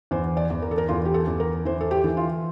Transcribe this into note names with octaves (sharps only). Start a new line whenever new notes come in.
E2 C5
D5
E2
A#4
A4
A#4
E2 F4
G4
A4
E2
A#4
E3 C5
A4
G4
E3
F4